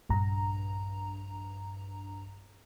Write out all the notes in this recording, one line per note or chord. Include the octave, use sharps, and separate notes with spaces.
A#1 G2 A#5